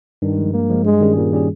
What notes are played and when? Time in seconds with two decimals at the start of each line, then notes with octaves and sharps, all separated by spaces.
0.22 G2 D#3
0.38 F3 G#3
0.53 G2 A#3
0.70 F3 G#3
0.85 G2 G#3
1.01 D#3 G3 C#4 G#4
1.16 G2 A#2
1.32 D#3 G3 C#4 G#4